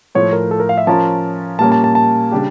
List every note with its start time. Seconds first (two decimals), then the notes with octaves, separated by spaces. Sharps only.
0.15 A2 F3 A3 C#5
0.33 A#4
0.51 A4
0.60 A#4
0.69 F5
0.78 E5
0.87 F3 C#4 F4 A#4 A5
1.59 A#2 G3 A#3 C#4 A5
1.72 A5
1.84 A5
1.95 A5
2.31 C#3 G3 D4 G4